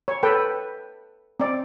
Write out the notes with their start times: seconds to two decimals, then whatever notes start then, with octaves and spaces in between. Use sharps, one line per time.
0.08 C#5
0.23 A4 B4 G5
1.40 C4 D5